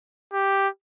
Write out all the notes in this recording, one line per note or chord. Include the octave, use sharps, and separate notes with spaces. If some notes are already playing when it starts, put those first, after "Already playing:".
G4